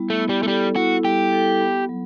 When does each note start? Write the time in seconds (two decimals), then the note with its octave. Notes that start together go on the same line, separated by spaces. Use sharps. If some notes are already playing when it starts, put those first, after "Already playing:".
Already playing: G3 B3 E4
0.10 A3
0.20 B3
0.29 G3
0.43 A3
0.48 G3 A4
0.76 E4 F#4
1.05 G3 G4
1.33 A4
1.61 B3
1.89 F#3